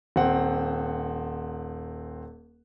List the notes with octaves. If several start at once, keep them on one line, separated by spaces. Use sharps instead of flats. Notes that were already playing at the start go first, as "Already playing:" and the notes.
D#1 C4 F#5